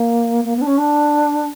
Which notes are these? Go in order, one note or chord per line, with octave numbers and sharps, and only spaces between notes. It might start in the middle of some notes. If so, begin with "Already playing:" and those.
Already playing: A#3
A#3
B3
D4
C#4
D4